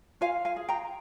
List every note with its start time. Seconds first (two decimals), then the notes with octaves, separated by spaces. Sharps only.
0.21 F4 F5 G#5
0.45 F5 G#5
0.56 G#4
0.69 G5 A#5